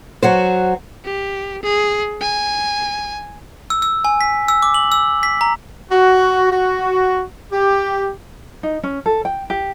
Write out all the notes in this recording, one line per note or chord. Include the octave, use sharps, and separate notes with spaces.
F#3 F#4 C5
G4
G#4
G#5
E6
E6
G#5
B6
E6
D6
F#7
E6
B6
A#5
F#4
F#4
G4
D#4
C#4
A4
G5
G4